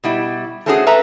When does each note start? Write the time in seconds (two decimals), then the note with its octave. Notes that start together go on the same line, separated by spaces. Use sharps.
0.04 B2 G3 E4
0.66 A3 C4 C#4 F4 F#4 G#4
0.87 A4 B4 E5 A#5